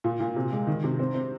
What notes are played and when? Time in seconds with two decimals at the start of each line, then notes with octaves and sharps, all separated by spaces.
0.04 A#2
0.20 A#2
0.36 C3
0.52 G#3
0.67 D#3
0.84 C3
0.99 C4
1.14 C4